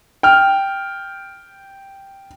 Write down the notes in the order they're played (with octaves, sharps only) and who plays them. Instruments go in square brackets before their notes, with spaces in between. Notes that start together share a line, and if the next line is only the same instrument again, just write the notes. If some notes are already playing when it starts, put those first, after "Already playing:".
[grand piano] G5 F6